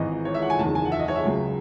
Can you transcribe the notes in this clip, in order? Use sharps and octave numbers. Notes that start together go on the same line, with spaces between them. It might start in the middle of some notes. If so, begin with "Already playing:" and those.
Already playing: G#1 G#2 E3 D#5
C#5
E5
F#5
G#5
F#1 E2 D#3 A5
G#5
F#5
E5
D#5
C#5
E5
C#2 C#3 F#3